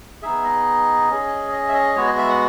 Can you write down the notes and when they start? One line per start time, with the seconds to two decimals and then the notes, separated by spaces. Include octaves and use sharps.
0.22 B3 D#4 G#4 E5
0.44 D#5
1.10 C#4 G#4
1.52 D#5
1.68 E5
1.74 D#5
1.95 G#3 B3 F#4 C#5
2.06 D#5
2.18 E5
2.29 F#5